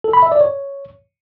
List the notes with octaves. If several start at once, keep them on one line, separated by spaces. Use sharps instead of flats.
A4
B5
E5
D5
C#5